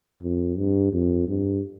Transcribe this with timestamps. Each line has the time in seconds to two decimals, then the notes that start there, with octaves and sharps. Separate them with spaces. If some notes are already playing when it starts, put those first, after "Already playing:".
0.23 F2
0.57 G2
0.93 F2
1.28 G2